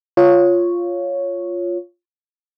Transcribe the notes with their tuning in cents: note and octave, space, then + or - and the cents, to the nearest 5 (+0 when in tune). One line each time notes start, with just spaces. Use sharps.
F4 +0 C#5 +0